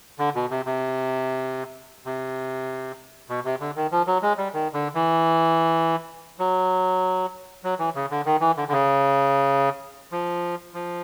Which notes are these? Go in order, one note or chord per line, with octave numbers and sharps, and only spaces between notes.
D3
B2
C3
C3
C3
B2
C3
D3
D#3
F3
F#3
G#3
G3
D#3
D3
E3
F#3
F#3
E3
C#3
D3
D#3
E3
D3
D3
C#3
F3
F3